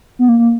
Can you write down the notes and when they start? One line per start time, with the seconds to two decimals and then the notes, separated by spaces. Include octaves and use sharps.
0.19 B3
0.29 A#3
0.39 A#3